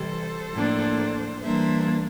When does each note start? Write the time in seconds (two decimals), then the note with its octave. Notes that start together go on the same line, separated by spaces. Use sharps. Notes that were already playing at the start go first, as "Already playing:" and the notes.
Already playing: C3 E3 G3 A4 C5
0.55 A2 F3 A#3 D4
1.44 E3 G3 A#3 D4 C5 E5